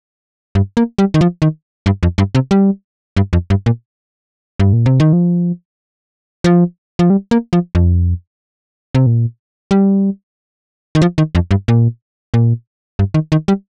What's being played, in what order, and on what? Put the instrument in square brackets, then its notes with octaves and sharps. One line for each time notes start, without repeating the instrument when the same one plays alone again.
[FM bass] G2
A#3
G3
D#3
F3
D#3
G2
F2
G2
C3
G3
G2
F2
G2
A#2
G2
A#2
C3
D#3
F3
F3
F3
G3
A#3
F3
F2
C3
A#2
G3
D#3
F3
D#3
F2
G2
A#2
A#2
G2
D#3
D#3
G3